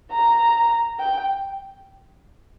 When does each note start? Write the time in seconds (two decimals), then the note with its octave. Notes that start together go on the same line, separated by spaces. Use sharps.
0.13 A#5
0.99 G5